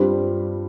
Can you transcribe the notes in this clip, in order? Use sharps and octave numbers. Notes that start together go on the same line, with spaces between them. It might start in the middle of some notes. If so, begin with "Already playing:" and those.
Already playing: G2 G3 C4 F4 G4